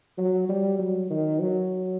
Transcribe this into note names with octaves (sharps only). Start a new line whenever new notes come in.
F#3
G3
F#3
D#3
F#3